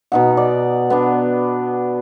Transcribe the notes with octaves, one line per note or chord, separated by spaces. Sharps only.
B2 D#4 F#5
D5
B3 D4